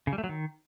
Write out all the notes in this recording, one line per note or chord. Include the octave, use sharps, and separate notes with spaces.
C#3
G3
A3
F#3
D#3